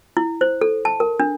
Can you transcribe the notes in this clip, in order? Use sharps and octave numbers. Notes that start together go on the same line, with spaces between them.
E4
C5
A4
A5
A#4
D4